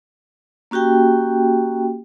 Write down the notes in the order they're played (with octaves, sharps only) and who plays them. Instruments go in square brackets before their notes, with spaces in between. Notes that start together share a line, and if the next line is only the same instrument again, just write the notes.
[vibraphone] A#3 C#4 F#4 G4 G5